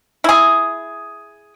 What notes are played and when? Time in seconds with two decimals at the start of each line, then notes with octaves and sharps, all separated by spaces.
0.24 E4 G#4